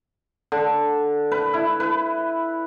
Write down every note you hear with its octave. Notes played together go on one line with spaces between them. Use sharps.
D3
B4
E4
B4